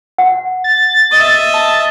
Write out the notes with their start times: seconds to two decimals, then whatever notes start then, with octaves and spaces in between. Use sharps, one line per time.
0.18 F#5
0.64 A6
1.11 D#5 E5
1.54 A5